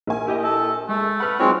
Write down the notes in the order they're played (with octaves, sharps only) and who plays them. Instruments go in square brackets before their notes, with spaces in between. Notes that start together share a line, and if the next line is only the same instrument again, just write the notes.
[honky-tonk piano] A#1 A#4 G#5
[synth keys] E4 G4 D#5
[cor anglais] A4
[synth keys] G#3 [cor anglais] A3
[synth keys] B4 F#5 [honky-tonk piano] B5 F6
[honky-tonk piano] F#3 D#4 F4 [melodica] G#3 C4 [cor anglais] C#5